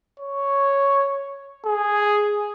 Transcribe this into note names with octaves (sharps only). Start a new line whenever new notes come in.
C#5
G#4